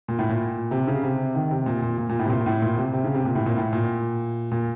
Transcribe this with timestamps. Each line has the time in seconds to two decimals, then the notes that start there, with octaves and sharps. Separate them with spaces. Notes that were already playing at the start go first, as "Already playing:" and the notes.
0.08 A#2
0.19 A2
0.29 A#2
0.71 C3
0.88 C#3
1.03 C3
1.35 D#3
1.51 C3
1.66 A#2
1.82 A#2
1.98 A#2
2.09 A#2
2.19 A2
2.25 C3
2.30 A#2
2.46 A2
2.62 A#2
2.77 C3
2.93 C3
3.04 C#3
3.14 C3
3.25 A#2
3.35 A2
3.46 A#2
3.57 A2
3.73 A#2
4.52 A#2